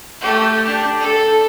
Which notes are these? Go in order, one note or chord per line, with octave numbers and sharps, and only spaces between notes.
A3 G4
D4 G4
A4